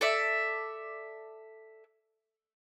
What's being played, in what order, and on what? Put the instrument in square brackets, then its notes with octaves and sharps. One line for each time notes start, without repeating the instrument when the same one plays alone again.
[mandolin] A4 D5 E5